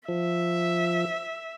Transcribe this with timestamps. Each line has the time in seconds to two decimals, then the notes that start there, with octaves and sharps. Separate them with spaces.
0.08 F3 E5